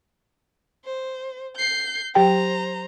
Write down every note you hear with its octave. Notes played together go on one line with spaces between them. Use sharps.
C5
G6 C7
F#3 G4 C5 G5 A#5